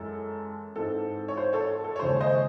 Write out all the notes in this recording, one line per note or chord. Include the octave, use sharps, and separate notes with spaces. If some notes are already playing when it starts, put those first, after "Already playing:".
Already playing: F#2 E3 G#3 A4
G#2 E3 C4 A4
C#5
C5
A4 C#5
A4
C#5
D#2 C#3 G#3 C5
C5 D#5